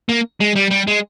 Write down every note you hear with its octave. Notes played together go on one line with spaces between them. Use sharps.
A#3
G#3
G3
G3
G#3